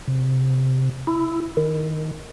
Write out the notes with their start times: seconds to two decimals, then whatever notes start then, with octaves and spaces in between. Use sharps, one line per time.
0.08 C3
1.07 E4
1.57 D#3